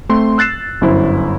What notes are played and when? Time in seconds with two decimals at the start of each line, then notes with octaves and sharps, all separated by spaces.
0.09 A3 C4 C6
0.38 E6 F#6 A6 C7 E7
0.81 G1 F#2 E4 C5